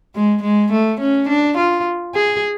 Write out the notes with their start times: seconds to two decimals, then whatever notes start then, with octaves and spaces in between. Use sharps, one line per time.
0.15 G#3
0.43 G#3
0.73 A3
1.00 C#4
1.29 D4
1.58 F4
2.15 G#4